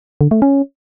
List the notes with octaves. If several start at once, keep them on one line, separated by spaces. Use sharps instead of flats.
D3
A3
C#4